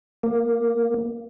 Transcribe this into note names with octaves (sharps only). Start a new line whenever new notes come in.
A#3